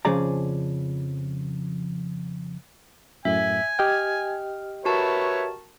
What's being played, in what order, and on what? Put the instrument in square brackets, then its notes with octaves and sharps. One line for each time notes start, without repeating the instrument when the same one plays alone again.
[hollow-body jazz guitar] F2 C#3 F3 G#4 D5 A#5
[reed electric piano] F#2 A2 [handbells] E5 [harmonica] G#5
[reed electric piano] G4 D#5 G5 [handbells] F6
[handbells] F#4 A#4 A5 [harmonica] B4 C#5 E5